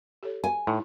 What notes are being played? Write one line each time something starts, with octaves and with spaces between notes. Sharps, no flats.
G4 A4 C#5
G#5
A2 D#4 E4